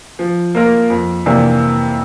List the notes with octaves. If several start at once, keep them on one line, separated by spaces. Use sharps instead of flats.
F3
A#3 F4 A#4
F2
C3 E3 A#3 D4